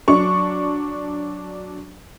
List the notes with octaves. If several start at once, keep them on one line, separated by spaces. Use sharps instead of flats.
F#3 D4 C#6